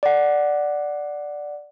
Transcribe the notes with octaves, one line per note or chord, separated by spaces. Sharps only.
D5 F#5